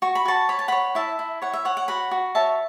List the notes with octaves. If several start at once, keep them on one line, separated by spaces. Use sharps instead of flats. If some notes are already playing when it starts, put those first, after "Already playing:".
F#4 C#6
B5
F#4 A5 C#6
C#5 B5
A5
C#5 F#5 B5
E4 E5 A5
E4
C#5 F#5
E5
C#5 F#5
F#5
F#4 F#5 B5
F#4
C#5 E5 A5